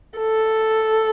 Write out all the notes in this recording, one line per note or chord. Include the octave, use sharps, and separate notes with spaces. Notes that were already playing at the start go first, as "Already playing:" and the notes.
A4